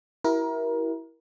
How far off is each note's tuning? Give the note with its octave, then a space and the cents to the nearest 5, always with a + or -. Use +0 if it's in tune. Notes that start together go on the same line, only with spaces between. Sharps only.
E4 -5 G4 -45 A#4 +25